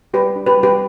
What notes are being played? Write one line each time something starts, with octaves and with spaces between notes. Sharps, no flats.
G3 G4 B4
D4
G4 B4
G3
G4 B4